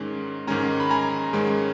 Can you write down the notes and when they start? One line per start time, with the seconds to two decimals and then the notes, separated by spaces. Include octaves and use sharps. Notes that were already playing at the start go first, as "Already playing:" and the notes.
Already playing: G#2 D#3 G#3 C#4
0.47 G#2 D#3 G#3 C#4 G#5 A#5
0.80 B5
0.90 G#5 A#5
1.33 G#2 D#3 G#3 C#4